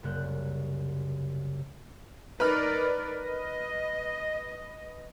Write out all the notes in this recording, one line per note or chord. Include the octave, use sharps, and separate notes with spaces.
C2 F#2 C#3 A#3 F#6 G6
D#4 A#4 B4 D5 B5 F6
D#5